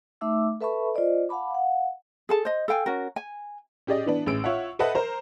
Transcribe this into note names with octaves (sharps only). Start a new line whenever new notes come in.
A3 D#4 E5 D6 E6
A4 B4 E5 A5 B5 C#6
F4 C5 D5 D#5
F5 F#5 A5 B5 D6
F5 F#5
G#4 A4 A5
C5 D#5
A4 F5 G5 G#5
C#4 F#4 A#4
G#5
C#4 G4 G#4 D5 D#5
E3 B3 D4
A1 G#4 E6 D7
F4 C#5 E5 F#5
A4 B4 C5 D#5 E5 F#5
A#4 C5 A#5